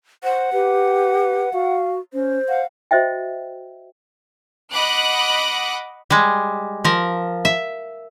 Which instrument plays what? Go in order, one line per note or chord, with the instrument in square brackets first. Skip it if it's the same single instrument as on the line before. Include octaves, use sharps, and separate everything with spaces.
[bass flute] C5 [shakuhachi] F#5
[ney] G4 [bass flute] B4
[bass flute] F#4 [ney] F5
[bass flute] C#4 [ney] C5
[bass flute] F5 [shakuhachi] F#5
[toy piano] F#4 C5 D#5 E5 G5
[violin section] D#5 F#5 B5 D6 F#6
[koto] G3 G#3
F3 A#4
E5